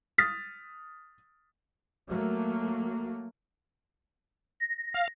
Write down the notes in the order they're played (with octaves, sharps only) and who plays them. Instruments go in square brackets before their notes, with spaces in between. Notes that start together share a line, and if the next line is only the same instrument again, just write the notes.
[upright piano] D#6 F6 A6 B6
[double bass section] F#3 A3 A#3
[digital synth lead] A#6
[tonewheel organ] F5